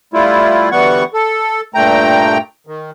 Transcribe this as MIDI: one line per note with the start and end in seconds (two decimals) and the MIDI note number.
0.13 0.69 55
0.13 0.69 57
0.13 0.69 64
0.13 0.69 65
0.72 1.04 38
0.72 1.04 52
0.72 1.04 55
0.72 1.04 59
0.72 1.04 78
0.72 1.04 85
1.14 1.61 69
1.74 2.38 43
1.74 2.38 46
1.74 2.38 57
1.74 2.38 79
1.74 2.38 82
2.67 2.91 51